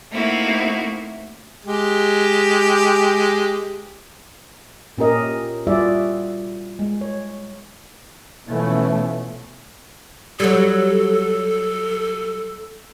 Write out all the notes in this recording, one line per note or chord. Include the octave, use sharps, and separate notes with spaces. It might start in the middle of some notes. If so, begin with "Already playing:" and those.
A3 A#3 C4 D#4 E4 F#4
G#3 G4
A#2 C#4 G4 A#4 D#5
G3 F4 F#4 G#4 D5 E5
G#3
C#5
B2 E3 F3 A3 B3 C#4
F#3 G3 A4